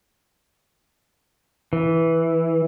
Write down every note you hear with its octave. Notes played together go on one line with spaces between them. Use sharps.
E3